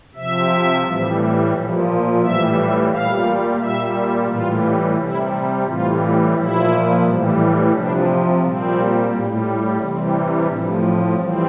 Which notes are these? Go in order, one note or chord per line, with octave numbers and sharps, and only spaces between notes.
C3 F3 E5
A2 E3 G3
A#2 F3
A2 E3 G3 E5
A#2 G3 F5
A#2 G3 E5
A2 E3 G3 F4
C3 G3 E4
A2 E3 G3 F4
A#2 F3 E4
A2 E3 G3
C3 F3 D4
A#2 G3 C4
A2 G3
C3 E3 G3 C4
A2 F3 D4
C4
E3 G3 C4